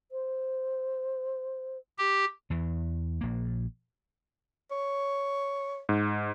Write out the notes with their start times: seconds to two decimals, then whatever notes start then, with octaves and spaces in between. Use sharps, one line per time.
0.12 C5
1.98 G4
2.50 E2 E3
3.21 A#1 A#3
4.71 C#5
5.89 G#2